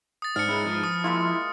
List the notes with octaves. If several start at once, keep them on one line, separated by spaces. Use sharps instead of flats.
D#6 A6
G#2 D4 F6 C#7
G#3 C#4 E4 A#4 B4
F3
D#6
G#3 A#3 E4 F4